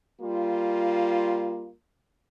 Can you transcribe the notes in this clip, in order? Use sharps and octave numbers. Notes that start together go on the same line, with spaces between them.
G3 A#3 F4